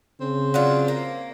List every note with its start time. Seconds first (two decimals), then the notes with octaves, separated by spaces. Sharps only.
0.21 C#3 C4
0.54 F#3 D4 F4
0.88 A#3